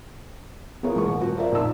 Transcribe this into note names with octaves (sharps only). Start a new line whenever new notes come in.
B3 E4 F4 G#4 A#4 C#5
E1 E3 A#3 A#4 C#6
A1
D#1 C4 F#4
F4 A#4 D5 E5
A#1 F2 D#4 E6